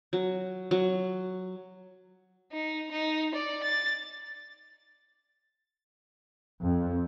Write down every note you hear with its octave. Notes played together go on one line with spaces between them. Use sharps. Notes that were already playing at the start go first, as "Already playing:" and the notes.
F#3
F#3
D#4
D#4
D5
A6
F2